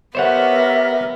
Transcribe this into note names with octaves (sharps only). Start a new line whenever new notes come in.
B3 G4 A#4 C5 C#5 E5 F#5